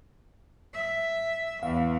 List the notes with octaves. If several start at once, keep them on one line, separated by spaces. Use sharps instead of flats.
E5
E2 F5